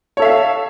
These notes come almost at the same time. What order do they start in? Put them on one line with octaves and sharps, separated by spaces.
C#5 A4 E5 F5